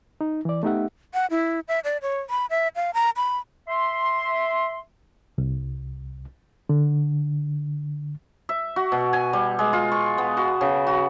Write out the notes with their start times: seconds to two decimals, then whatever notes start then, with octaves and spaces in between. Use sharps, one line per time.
0.21 D#4
0.45 E3 D5
0.63 A3 B3 D#4 G4 E5 F#5
1.14 F#5
1.30 E4
1.68 E5
1.84 D5
2.02 C#5
2.30 B5
2.50 E5
2.76 F5
2.94 A#5
3.16 B5
3.68 E5 C6
5.38 C2
6.69 D3
8.49 E5
8.76 F#4
8.92 B2
9.13 G#5
9.33 G3
9.59 G#3
9.73 F4
9.92 C#6
10.18 B3
10.37 F#4
10.61 C#3
10.87 F#4